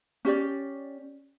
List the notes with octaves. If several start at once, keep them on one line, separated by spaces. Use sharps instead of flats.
C#4 G4 D5